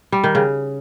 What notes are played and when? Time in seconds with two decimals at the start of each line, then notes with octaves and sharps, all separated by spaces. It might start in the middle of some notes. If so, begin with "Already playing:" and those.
0.12 G3
0.24 D#3
0.35 C#3